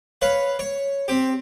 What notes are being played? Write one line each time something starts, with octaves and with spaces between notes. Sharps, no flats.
B4 C#5 F5
C#5
C4 G4